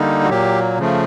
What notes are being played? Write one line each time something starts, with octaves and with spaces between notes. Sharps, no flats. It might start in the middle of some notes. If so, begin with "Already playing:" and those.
Already playing: D3 G3 A#3 D#4
F#4
A#2 F#3 A#3 G4
C#3 F3 A3